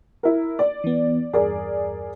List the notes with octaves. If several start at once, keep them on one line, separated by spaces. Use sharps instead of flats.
E4 A#4
D5
E3 B3
E2 G2 G#4 A#4 D5